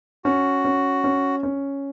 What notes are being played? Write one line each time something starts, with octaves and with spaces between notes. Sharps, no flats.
C#4 F#4
C#4
C#4
C#4